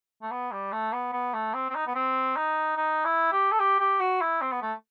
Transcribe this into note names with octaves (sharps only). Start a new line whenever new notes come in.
A3
B3
G3
A3
B3
B3
A3
C4
C4
D#4
B3
C4
D#4
D#4
E4
G4
A4
G4
G4
F#4
E4
C4
B3
A3